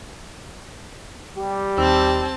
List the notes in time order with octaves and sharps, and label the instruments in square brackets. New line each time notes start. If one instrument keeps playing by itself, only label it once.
[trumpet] G3 [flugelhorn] G4
[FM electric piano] D#2 D#4 E6 [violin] C4 A5